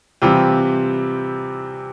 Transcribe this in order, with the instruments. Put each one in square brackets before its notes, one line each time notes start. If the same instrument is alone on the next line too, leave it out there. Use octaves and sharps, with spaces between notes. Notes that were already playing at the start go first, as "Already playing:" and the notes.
[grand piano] C3 E3 G3 C4 F4